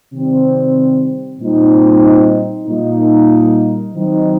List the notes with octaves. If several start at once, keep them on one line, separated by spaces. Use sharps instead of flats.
C3 D#3 G3 C4
A#2 G3 C4 D#4
A#2 G3 A#3 D#4
D#3 F#3 C4 D#4